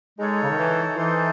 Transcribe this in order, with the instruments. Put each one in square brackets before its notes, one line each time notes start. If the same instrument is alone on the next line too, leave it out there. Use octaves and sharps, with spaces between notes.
[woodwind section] G#3 [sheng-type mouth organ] D#4 A4 C#5
[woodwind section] C#3
D#3
E3
[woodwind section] E3 [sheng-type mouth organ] D#4 A4 C5